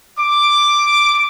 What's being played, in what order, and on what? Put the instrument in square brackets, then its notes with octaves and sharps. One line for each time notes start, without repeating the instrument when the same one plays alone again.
[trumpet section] D6